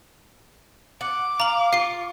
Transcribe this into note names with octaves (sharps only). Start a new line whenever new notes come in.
F#5 D6
F5 A#5 F#7
F4 F5 C7